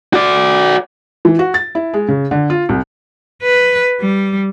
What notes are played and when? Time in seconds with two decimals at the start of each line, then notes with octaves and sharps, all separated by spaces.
0.14 F#4 D5
1.25 E3
1.39 F#4
1.54 A6
1.75 E4
1.94 G#3
2.08 C#3
2.31 D3
2.50 F4
2.69 C2
3.42 B4
4.00 G3